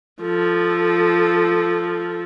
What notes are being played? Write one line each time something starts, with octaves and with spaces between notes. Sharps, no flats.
F3 A4